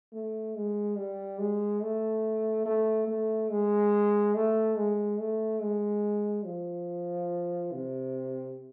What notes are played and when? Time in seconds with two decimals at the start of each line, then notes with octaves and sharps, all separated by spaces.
0.13 A3
0.56 G#3
0.98 G3
1.39 G#3
1.82 A3
2.66 A3
3.08 A3
3.51 G#3
4.35 A3
4.76 G#3
5.19 A3
5.62 G#3
6.45 F3
7.72 C3